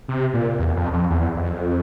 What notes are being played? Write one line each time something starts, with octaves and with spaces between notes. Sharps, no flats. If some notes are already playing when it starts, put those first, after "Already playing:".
C3
A#2
E2
F2
F2
E2
F2